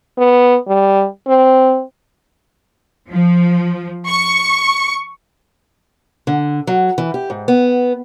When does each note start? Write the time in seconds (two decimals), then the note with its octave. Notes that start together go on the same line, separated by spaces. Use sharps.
0.18 B3
0.68 G3
1.28 C4
3.10 F3
4.06 C#6
6.27 D3
6.67 F#3
6.98 E3
7.14 G4
7.30 G#2
7.48 B3